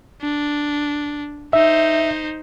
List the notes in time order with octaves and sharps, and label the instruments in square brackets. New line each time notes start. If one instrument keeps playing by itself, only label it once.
[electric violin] D4
[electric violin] D#4 C5 [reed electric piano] E5